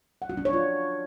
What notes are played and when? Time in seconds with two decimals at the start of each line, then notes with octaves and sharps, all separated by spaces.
0.22 F#5
0.30 F#4
0.37 D4
0.45 C#5
0.53 F4